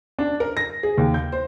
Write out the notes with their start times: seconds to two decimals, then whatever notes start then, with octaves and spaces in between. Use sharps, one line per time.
0.19 D4
0.40 A#4
0.57 A#6
0.83 G#4
0.98 D#2
1.14 G6
1.32 C5